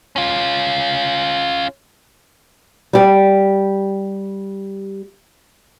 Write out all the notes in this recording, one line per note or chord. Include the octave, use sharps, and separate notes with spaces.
C#4 F4
G3 G4